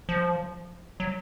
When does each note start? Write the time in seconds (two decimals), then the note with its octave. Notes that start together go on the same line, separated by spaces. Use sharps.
0.09 F3
1.00 F#3